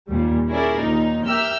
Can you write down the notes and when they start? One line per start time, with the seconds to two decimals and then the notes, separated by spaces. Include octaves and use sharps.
0.10 D#2 A#2 G3
0.49 C#4 E4 G#4 A#4 D5
0.78 D#2 A#2 D#4
1.26 G4 A#4 E5 E6 F6 G6